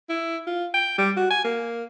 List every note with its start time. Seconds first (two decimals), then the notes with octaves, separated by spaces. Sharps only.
0.09 E4
0.47 F4
0.74 G5
0.98 G3
1.17 F#4
1.31 G#5
1.44 A#3